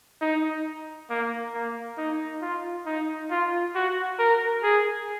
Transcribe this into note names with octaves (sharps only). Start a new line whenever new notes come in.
D#4
A#3
A#3
D#4
F4
D#4
F4
F#4
A#4
G#4